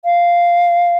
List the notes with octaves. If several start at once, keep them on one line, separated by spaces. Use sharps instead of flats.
F5